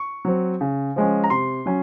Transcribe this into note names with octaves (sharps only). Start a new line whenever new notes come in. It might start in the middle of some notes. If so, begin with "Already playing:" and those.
Already playing: C#6
F#3 C4
C#3
F3 G#3 C#4
A#5
C3 C6
F#3 C#4